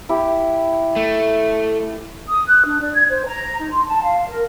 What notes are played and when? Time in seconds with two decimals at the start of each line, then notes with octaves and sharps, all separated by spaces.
0.09 E4 G4
0.96 A3
2.28 D#6
2.47 F#6
2.65 D4
2.80 D5
2.95 G#6
3.08 C5
3.26 A#5
3.59 D#4
3.72 C6
3.87 A5
4.02 F5
4.28 A#4